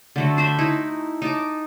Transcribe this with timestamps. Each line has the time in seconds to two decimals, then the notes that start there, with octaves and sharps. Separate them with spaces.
0.16 D3 A3 F#4
0.37 D4 C5 E5 B5
0.58 D#4 E4
1.22 D#4 A5 D6